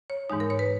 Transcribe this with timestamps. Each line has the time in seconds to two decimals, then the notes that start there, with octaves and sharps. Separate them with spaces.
0.10 C#5
0.30 G#2 E3 G#3 D#4
0.40 A#4
0.50 C#5
0.59 B4